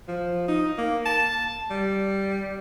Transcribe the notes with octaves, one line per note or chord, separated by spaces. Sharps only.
F3
D#4
A#3
A5
G3